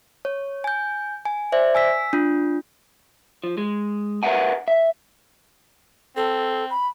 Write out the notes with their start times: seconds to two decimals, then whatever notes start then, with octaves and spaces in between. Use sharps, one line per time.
0.25 C#5
0.64 G#5 G6
1.25 G#5
1.52 C5 D5 E5
1.75 G#5 E6 B6
2.13 D4 F4
3.44 F3
3.57 G#3
4.23 A#4 B4 D5 E5 F#5 G#5
4.68 E5
6.17 C4 A4
6.70 B5